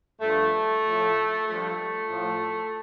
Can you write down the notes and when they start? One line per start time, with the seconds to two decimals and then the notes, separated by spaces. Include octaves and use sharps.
0.21 G2 F3 A3
0.84 A2 F3
1.46 G2 F3 A3
2.09 A2 F3